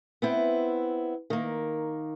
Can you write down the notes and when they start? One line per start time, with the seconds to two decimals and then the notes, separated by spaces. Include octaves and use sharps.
0.22 B3 C4 E4
1.30 D#3 A#3